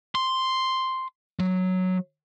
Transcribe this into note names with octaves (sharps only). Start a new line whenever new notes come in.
C6
F#3